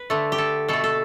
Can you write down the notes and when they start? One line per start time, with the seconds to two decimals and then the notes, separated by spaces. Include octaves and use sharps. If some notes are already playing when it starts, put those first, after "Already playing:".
Already playing: B4
0.10 D3 A3
0.32 G4
0.38 A4
0.68 B2 A3 A4
0.84 A4